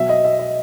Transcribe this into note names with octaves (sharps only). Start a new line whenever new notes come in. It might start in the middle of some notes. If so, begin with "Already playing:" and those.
Already playing: B2 F#3 E5
D#5
E5
D#5